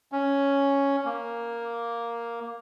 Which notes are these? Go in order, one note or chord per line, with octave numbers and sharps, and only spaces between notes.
C#4
A#3